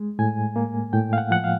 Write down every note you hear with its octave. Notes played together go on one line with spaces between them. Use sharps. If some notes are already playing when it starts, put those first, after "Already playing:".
Already playing: G#3
A2 G#5
A#3
A2 G5
F5
F#5
F3 F#5
F5